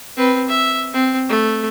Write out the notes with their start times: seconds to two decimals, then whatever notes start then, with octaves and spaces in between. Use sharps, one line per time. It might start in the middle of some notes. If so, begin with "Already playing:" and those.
0.17 C4 B4
0.49 E5
0.94 C4
1.29 A3